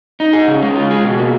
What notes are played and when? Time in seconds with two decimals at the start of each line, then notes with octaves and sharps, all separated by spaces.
0.20 D#4
0.33 G#4
0.48 C#3
0.62 G#3
0.76 F4
0.91 G#4
1.04 B2
1.18 A#3